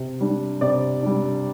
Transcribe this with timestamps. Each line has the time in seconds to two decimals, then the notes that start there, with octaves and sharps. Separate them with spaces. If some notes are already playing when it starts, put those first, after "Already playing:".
Already playing: C3
0.21 G3 D4
0.61 C3 D5
1.03 G3 D4